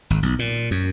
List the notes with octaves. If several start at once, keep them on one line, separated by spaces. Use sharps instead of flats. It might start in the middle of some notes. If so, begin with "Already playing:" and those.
G#1
B1
A#2
F#2